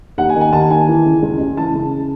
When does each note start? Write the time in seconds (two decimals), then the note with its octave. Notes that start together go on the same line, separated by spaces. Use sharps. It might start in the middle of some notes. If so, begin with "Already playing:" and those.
0.18 D#2 F#5
0.29 G#5
0.35 D#3
0.41 G#5
0.52 D#2 A5
0.70 D#3 G#5
0.88 E3
1.05 C#3
1.22 C#2
1.40 C#2
1.57 E3 A5
1.75 C#3